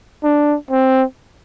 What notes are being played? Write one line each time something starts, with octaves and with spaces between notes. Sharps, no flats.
D4
C4